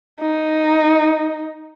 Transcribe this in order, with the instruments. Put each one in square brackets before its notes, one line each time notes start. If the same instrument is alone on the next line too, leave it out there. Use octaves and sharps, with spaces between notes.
[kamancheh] D#4